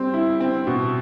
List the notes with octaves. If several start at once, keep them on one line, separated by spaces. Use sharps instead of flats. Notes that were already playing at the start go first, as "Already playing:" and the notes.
Already playing: G3 C4
E4
C4
B2